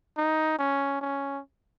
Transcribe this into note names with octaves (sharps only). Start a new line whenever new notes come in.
D#4
C#4
C#4